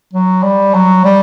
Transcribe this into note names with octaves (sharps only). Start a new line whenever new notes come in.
F#3
G3
F#3
G3